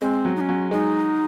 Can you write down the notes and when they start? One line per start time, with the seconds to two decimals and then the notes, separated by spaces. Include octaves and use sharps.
0.01 G#3 C4
0.25 F#3
0.36 D#4
0.40 C#4
0.49 F#3
0.71 G#3 D#4